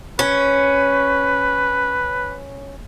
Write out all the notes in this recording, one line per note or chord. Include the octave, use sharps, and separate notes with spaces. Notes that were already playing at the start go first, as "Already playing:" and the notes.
C#4 B4